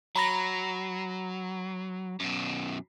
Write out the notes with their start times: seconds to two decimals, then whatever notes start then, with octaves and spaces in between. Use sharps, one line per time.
0.16 F#3 A#5 B5 A#6
2.20 F#2 B2